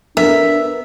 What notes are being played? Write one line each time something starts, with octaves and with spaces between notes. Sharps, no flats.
B3 D4 A#4 E5